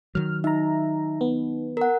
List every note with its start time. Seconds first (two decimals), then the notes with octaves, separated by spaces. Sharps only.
0.15 D#3 F#3 F6
0.44 D#4 E5 A#5
1.21 B3
1.77 A#4 F#5